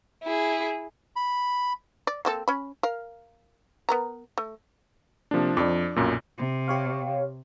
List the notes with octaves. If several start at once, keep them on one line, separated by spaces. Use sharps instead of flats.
E4 G#4
B5
D5
A#3 C4 A4
C#4 B5
A#4 F5
B3 A#4 A#5
A3
C3 F3 A#3 D4
F2 F3 D4 D6
B1 F#2 A#2
C3
G4 C#5 F5